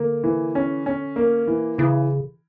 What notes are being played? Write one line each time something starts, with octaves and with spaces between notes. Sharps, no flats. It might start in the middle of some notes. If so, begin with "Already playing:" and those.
Already playing: D3 A#3
E3
C#4
C#4
A#3
E3
C#3 E3